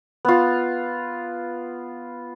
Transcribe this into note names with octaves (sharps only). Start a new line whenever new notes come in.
B3 F4